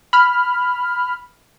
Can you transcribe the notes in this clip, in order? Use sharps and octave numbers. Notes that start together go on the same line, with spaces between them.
B5 F6